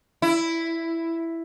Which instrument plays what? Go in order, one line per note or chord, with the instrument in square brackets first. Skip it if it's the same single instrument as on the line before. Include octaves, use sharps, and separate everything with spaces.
[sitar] E4